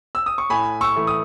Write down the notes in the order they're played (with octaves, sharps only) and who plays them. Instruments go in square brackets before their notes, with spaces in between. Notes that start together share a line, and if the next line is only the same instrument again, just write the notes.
[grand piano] E6
D#6
C#6
A2 G#5 B5
C#6 E6
E3 A3
D#6